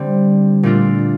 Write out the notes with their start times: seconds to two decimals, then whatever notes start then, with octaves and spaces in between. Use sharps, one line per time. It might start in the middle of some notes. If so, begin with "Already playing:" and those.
Already playing: D3 G3 C4
0.63 A#2 A3 D4 F4